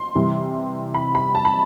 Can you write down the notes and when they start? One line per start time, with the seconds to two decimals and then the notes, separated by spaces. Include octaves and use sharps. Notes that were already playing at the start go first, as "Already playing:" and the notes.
Already playing: C6
0.15 C3 E3 G3
0.94 B5
1.15 B5
1.35 A5
1.45 B5